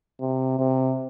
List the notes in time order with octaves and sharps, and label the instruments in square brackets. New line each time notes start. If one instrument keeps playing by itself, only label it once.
[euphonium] C3
C3